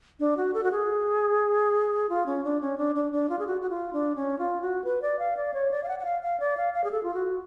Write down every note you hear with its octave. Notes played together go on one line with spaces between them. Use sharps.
D4
F#4
A4
F#4
G#4
F4
C#4
D4
C#4
D4
D4
D4
F4
G#4
F#4
F#4
F4
D4
C#4
F4
F#4
B4
D5
F5
D5
C#5
D5
F5
F#5
F#5
F5
F5
D5
F5
F5
G#4
A4
F4
F#4